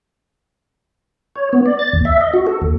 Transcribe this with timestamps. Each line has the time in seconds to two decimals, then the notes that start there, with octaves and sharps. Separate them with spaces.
1.36 C#5
1.53 B3
1.66 D5
1.79 A6
1.93 D#2
2.05 E5
2.21 D#5
2.33 F#4
2.47 A4
2.62 D#2